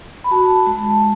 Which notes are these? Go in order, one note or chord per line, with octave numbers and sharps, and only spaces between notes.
B5
F#4 A5
G#3 A5